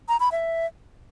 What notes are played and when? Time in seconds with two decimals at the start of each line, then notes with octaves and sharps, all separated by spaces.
0.08 A#5
0.20 B5
0.31 E5